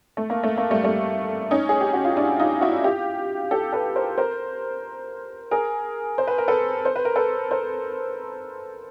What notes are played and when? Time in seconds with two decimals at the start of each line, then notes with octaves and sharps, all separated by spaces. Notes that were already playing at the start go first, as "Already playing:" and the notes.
0.17 A3
0.30 A#3
0.43 A3
0.58 A#3
0.70 G3 A3
0.83 G3 A3
1.51 C#4 D#4
1.69 G#4
1.81 G4
1.93 F#4
2.05 F4
2.17 D4 E4
2.40 D#4 F4
2.61 E4 F#4
2.84 F4 G4
3.51 G4 A4
3.73 A4 B4
3.95 A#4 C5
4.18 A#4 C5
5.51 G#4 A#4
6.18 C5
6.27 B4
6.38 A#4
6.48 A4 B4
6.85 C5
6.96 B4
7.05 A#4
7.16 A4 B4
7.51 A#4 C5